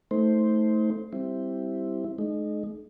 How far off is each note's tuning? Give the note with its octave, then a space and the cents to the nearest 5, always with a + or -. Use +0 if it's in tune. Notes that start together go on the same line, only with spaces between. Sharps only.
A3 +0 D#4 +40 C5 +0
G3 +0 C4 +0 E4 +0
G#3 +40 D#4 -25